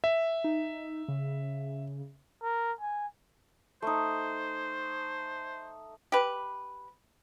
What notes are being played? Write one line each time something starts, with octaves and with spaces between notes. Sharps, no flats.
E5
D#4
C#3
A#4
G#5
A3 D#4 C5
G4 B4